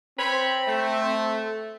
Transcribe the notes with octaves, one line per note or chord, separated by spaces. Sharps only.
C4 C5 C#5 B5
A3